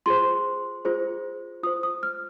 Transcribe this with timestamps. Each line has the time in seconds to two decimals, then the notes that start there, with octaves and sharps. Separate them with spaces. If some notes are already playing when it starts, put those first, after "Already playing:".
0.06 F4 G#4 C5 C6
0.85 F4 G#4 C5
1.63 F4 C5 D#6
1.83 D#6
2.03 F6